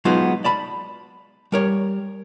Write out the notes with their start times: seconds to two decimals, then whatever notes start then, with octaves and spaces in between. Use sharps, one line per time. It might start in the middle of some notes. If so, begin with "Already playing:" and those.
0.05 F#3 G#3 B3 D#4 F4 F#4
0.44 D5 A5 B5
1.52 G3 A#4 C#5